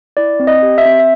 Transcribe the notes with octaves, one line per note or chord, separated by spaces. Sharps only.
E4 D5
C4
D#5
G4
E5
C4
E5